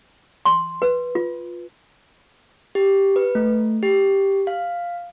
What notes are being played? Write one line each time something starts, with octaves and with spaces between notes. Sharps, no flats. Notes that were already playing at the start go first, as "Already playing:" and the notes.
C6
B4
F4
G4
B4
A3
G4
F5